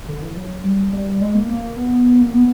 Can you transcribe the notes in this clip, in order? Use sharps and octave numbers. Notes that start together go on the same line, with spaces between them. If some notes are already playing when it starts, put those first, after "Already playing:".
D3
E3
F#3
G3
G3
G#3
A#3
A#3
B3
A#3
B3